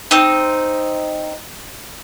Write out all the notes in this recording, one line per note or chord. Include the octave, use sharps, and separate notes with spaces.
C4 D#4